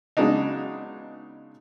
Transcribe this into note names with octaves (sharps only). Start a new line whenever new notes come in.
C#3 F#3 G#3 B3 D4 D#4